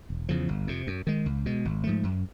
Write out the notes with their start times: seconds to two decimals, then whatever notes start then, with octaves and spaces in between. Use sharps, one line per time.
0.10 E1
0.29 E2 C#3 F3
0.48 G1
0.67 F2 C3
0.87 F#2
1.07 D#3 G#3
1.26 C#2
1.46 B2 G#3
1.65 G#1
1.84 G#2 F3 A3
2.03 F#2